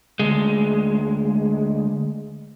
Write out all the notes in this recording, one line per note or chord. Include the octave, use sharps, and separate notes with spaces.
D2 G#3